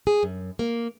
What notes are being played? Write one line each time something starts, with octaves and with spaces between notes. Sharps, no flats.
G#4
F#2
A#3